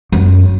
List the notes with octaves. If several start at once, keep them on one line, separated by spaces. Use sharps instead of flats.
F#2